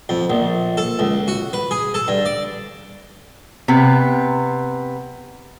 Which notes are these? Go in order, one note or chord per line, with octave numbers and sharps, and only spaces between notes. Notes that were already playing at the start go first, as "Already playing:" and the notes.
F2
A#1
A4
C#2
F#4
B4
G#4
A4
G2
D5
C3 B3